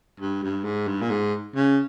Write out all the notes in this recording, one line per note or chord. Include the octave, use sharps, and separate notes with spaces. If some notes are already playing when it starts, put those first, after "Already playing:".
G2
G2
G#2
G2
A#2
G#2
C#3